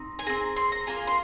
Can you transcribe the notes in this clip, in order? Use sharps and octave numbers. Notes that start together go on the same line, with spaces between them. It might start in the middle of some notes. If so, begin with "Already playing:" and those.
Already playing: C4 D#4
G#5
C4 G#4 A#5
C6
A#5
A#3 F4 G#4 G#5
C6